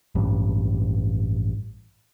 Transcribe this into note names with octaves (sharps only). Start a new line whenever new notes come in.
A1 G2